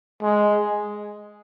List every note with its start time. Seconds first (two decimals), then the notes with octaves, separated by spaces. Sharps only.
0.22 G#3